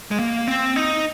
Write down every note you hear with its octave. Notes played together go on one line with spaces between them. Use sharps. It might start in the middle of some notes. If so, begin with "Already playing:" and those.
G#3
A#3
C4
D#4